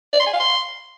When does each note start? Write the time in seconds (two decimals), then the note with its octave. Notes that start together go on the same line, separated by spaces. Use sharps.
0.13 D5
0.20 C6
0.26 G#5
0.33 F5
0.40 C6